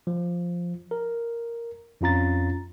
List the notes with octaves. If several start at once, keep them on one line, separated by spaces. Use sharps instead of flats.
F3
A#4
F2 C#4 F4 A#5 A6